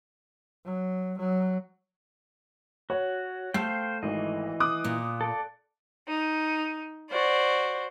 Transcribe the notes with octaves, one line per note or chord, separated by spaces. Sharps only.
F#3
F#3
F#4 C#5
A3 C5 F5 G5 C7
G#1 E3 D#5
D6 D#6 F#6
A#2
A4 D5
D#4
F#4 C5 D5